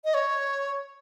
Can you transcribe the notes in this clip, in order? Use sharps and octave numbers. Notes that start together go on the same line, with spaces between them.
D#5
C#5